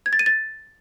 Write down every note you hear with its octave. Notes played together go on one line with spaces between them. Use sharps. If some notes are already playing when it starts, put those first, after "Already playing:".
G#6
A6
D#7
A6